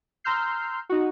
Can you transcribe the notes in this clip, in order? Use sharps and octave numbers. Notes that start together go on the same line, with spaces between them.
A#5 C6 E6 F6 G6 C7
D#4 F#4